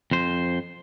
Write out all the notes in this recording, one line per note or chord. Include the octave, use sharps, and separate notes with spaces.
F2 C5